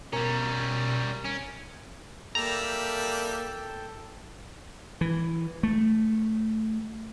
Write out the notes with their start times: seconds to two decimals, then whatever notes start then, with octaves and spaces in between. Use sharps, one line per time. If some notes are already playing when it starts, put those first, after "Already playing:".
0.13 B2 G3 C#4 A#4
1.25 C#4 D7
2.35 G3 A#3 A4 E5 G5 A#5
5.01 E3
5.63 A3